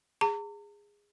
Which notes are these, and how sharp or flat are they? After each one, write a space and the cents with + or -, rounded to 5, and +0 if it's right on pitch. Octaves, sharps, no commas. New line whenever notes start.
G#4 -20 A#5 -45